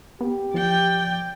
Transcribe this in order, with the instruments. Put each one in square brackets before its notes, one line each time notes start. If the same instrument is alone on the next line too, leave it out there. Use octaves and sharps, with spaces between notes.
[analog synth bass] B3 [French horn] G4
[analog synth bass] F3 [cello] D5 G5